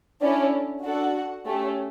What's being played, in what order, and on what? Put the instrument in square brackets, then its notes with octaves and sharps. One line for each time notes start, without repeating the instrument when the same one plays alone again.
[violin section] C#4 D4 E4 A4 D5
D4 F#4 A4 F#5
A3 C#4 G4